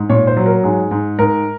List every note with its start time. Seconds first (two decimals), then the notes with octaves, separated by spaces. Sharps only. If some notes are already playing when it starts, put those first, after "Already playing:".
Already playing: G#2
0.10 A#2 C#5
0.27 C5
0.37 F#3
0.46 A#4
0.64 G#2 G#4
0.91 G#2
1.19 G#2 A#4